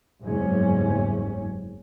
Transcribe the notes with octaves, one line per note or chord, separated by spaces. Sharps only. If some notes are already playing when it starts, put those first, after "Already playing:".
F#1 E2 G#2 G3 C#4